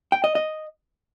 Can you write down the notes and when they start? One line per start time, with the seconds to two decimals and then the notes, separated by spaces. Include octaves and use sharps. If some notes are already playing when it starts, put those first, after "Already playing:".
0.12 G5
0.24 D#5
0.35 D#5